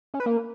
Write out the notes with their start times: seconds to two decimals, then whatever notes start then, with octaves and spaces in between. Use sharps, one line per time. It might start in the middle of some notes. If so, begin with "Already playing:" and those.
0.14 C#4
0.20 B4
0.26 A#3